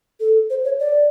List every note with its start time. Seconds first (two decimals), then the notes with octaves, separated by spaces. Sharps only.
0.20 A4
0.50 C5
0.65 C#5
0.80 D5